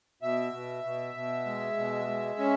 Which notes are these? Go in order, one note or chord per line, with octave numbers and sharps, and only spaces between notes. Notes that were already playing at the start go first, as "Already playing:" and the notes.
B2 E5
B2
B2
B2
G#3
B2
G#3
C#4